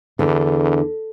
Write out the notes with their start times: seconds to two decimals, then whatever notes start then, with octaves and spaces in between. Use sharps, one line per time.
0.19 E2 D3